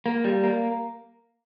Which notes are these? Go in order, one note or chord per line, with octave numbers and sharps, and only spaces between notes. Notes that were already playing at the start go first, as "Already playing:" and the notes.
A#3
G3
A#3